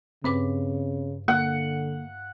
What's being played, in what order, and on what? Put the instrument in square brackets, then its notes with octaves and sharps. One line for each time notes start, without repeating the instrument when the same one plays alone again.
[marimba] G2 B4 D6 [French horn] C#3 [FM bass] C4
[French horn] D3 [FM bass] A#3 [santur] F#5